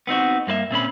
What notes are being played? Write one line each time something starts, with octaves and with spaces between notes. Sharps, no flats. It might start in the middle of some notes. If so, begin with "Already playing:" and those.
B3 C4 D#4 F#4
G2 A#3 B4 E5
A#2 C4 C#4 B5